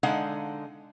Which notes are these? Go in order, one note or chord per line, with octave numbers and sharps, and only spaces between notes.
D3 G#3 D#4 F5 F#5